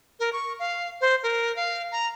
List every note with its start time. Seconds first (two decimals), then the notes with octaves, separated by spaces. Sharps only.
0.20 A#4
0.33 C#6
0.59 F5
1.01 C5
1.23 A#4
1.56 F5
1.92 A#5